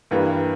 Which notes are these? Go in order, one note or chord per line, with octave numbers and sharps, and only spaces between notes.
G2 E3 G3 A#3 B4